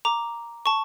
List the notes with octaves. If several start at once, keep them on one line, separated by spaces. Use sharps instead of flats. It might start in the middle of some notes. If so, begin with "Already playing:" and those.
A#5 D6
A5 C#6